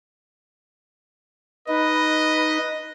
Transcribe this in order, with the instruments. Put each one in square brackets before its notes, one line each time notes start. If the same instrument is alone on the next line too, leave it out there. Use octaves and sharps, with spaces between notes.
[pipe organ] D#4 [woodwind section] B4 [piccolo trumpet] D#5